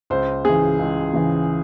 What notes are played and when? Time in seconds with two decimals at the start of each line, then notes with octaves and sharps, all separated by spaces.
0.10 C#2 C5
0.45 C#3 E3 G#4
0.79 C#2
1.13 C#3 E3